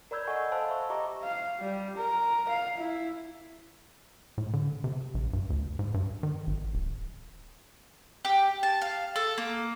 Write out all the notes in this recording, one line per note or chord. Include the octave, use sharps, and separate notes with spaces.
A#4 D5 B5 E6 G6 G#6
A4 D#5 F#5 G#5 C#6
C5 F5 A5 B5 E6 F#6
E5 B5 C#6
G4 D#5 A#5 C#6 D6
F5
G3
A#4
F5
E4
A2
D3
C3
A#1
G2
D2
G#2
G2
D#3
G#1
D1
G4
A5
F5
A4
A#3